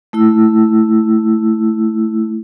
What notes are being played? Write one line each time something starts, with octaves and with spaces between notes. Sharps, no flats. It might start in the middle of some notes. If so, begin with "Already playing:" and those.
A3 E4 E6